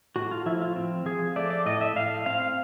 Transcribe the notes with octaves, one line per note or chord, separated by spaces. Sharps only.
A2 F#4
F4
F3 E4
F4
C4
F3 G#4
A3 D5
D5
A2 D#5
E5
A2 F5
C4 F5